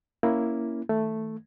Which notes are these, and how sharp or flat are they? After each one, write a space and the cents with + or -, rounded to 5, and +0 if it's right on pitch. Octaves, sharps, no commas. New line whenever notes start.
A#3 +0 C#4 +0 E4 +0
D#3 +35 A3 +0